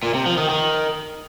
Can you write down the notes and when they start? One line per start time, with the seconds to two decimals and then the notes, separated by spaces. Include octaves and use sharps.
0.03 A#2
0.14 C3
0.26 F3
0.37 D#3
0.49 D#3